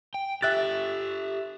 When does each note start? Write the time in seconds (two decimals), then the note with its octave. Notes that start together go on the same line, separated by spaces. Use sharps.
0.14 G5
0.42 G4 A4 E5 F#6 A6